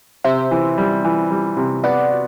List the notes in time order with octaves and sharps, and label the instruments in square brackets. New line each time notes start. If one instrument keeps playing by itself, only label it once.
[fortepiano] C3 [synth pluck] C5 E5
[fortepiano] E3
G3
E3
G3
C3
[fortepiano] B3 [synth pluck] D5 F#5
[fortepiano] F#4